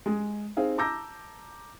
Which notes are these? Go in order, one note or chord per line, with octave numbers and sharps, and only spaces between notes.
G#3 G#4
C4 D#4 G#4 F5
A5 A#5 D6 E6 G6 A#6